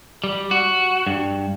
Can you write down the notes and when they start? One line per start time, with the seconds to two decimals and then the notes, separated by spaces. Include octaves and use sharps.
0.24 G3
0.51 F#4
1.07 G2